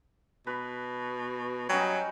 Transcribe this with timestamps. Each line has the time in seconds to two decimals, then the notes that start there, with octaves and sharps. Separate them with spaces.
0.47 B2 B4
1.69 F#3 G3 C#4 D#4